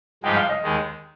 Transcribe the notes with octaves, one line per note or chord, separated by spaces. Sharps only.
G2 F3 G#3 D#4 G4 G5
F5
D#5
D#2 D#3 G#3